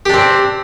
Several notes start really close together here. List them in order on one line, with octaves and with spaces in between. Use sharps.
G4 D4 C4